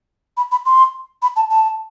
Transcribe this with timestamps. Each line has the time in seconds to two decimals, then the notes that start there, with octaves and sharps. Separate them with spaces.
0.37 B5
0.51 B5
0.66 C6
1.22 B5
1.36 A5
1.50 A5